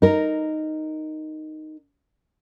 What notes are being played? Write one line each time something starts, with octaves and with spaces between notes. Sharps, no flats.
D#4 A#4